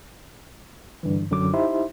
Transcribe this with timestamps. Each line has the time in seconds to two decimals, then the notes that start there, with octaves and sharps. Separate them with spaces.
1.03 G2 D3 E3
1.30 A1 F#2 D3 F#3 D6
1.53 D#4 E4 G4 C5 E5 C6